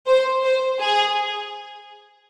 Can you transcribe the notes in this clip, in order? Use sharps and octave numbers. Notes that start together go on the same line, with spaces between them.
C5
C5
G#4